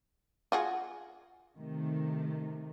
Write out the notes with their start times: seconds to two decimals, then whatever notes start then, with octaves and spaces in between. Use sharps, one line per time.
0.52 F4 F#4 G#4
1.57 C3 D#3 A3